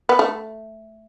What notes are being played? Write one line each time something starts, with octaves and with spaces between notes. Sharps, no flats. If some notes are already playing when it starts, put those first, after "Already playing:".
B3
A3